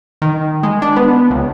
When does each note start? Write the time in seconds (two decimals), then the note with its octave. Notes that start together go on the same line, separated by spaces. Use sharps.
0.22 D#3
0.63 G#3
0.82 D4
0.96 B3
1.30 C#2